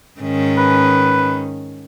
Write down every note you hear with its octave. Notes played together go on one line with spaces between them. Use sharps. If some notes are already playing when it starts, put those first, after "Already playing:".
G#2 D#3 C#4
B4